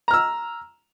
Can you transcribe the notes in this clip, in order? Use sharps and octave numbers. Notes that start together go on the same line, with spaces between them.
A#5 E6 F6